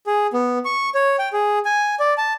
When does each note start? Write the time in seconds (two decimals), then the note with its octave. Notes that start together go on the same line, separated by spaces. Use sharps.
0.07 G#4
0.33 B3
0.65 C#6
0.95 C#5
1.19 G5
1.33 G#4
1.65 G#5
1.99 D5
2.17 A5